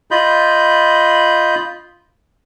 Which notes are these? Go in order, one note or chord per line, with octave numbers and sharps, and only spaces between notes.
F4 D#5 B5 G6